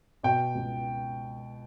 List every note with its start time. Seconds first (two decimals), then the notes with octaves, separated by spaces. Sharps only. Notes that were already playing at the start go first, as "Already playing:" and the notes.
0.23 B2 G5
0.55 C#2